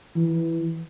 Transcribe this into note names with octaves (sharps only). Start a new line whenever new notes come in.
E3